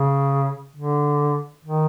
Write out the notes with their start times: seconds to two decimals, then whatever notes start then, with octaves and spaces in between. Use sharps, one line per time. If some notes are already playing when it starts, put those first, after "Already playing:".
Already playing: C#3
0.76 D3
1.64 D#3